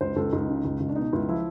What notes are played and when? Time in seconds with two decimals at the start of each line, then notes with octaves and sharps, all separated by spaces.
0.01 C#2 C5
0.16 C#2 A4
0.33 C#2 D#4
0.48 C#3
0.65 C#2
0.80 C#2
0.89 D4
0.96 B2 D#4
1.13 C#2 E4
1.28 F3 E4